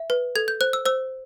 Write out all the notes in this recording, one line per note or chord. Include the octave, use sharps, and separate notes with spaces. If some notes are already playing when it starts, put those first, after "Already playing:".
Already playing: E5
B4
A4 G#6
G6
C5 F#6
E6
C5 E6